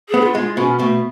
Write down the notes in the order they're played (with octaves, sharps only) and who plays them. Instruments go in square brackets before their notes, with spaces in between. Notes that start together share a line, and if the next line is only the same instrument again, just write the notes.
[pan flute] G#4
[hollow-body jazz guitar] B3
[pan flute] D4
F4
[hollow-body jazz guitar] G#3 [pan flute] D4
[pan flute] F4
[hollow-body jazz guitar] B2 [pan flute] C#4
[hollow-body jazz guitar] B2 [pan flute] A3